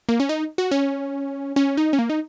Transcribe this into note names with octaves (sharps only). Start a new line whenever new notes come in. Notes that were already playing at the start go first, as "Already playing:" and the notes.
A#3
C#4
D#4
F#4
C#4
C#4
D#4
C#4
A#3
D#4